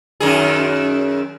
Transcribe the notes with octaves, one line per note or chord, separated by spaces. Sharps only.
F#2 D#3 G#4